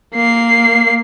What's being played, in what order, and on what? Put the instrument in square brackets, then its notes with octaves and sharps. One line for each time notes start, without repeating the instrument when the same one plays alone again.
[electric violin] A#3 C7